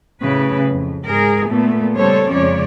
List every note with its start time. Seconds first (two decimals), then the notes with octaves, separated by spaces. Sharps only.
0.21 A2 C#3 F#3 B4
0.70 F2
1.06 G#2 G#4 A#4
1.49 A#2 A3 B3
1.97 C#3 G3 A4 C5 C#5
2.29 F2 C#3 G#3 C#5 D5